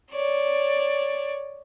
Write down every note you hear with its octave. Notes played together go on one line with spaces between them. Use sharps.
C#5 D5